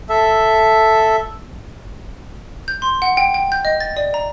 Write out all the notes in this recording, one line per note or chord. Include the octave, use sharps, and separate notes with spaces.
A4 E5
G6
C6
F#5
G5
G5
G6
D#5
A6
D5
A#5